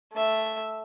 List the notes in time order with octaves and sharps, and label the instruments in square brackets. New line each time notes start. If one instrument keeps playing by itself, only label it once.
[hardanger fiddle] A3 E5